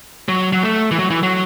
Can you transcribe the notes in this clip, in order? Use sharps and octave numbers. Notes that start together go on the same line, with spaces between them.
F#3
F#3
A3
E3
F#3
E3
F#3